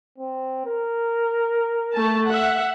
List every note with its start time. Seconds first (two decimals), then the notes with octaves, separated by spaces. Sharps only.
0.18 C4
0.66 A#4
1.94 A3 A5
2.28 E5 F#5